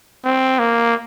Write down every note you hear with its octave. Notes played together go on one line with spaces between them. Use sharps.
C4
A#3